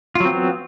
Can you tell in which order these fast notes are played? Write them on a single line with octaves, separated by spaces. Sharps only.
F4 F#3 C4 B3